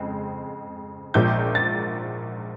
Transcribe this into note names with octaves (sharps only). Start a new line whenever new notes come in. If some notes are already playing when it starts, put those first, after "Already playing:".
Already playing: F2 C#3 G#3 C4
A#1 A#2 F3 G#3 G6
A6